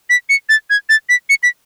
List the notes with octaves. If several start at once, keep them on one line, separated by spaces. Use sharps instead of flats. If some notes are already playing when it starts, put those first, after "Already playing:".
B6
C#7
A6
G#6
A6
B6
C#7
B6